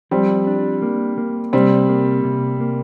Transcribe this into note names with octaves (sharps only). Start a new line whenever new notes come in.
F3 G3 C4
D4
A#3
A#3
C3 G3 C4
A#3
C3
A#3